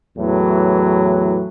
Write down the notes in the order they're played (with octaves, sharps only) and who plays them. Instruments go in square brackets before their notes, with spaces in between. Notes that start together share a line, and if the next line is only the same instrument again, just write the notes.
[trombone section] E2 A2 E3 F#3